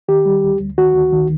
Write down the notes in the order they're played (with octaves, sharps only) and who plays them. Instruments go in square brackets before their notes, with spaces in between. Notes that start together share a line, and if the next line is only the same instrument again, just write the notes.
[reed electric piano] D#3 G4
G3
D2
D2
D#3 F#4
D2
D#3